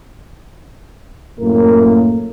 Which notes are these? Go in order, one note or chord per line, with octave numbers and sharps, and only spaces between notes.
F#2 A2 A#3 A#4